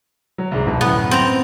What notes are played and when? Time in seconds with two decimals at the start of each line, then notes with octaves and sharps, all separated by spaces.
0.38 F#3
0.51 C2 G#2
0.67 D1 B2
0.81 F#2 A2 B3
1.11 C4 A#5